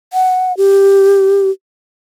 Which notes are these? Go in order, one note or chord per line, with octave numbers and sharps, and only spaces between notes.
F#5
G4